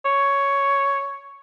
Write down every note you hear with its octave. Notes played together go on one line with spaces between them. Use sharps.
C#5